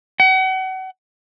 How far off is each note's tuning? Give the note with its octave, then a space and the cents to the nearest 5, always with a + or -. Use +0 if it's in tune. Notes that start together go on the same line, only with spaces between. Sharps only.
F#5 +35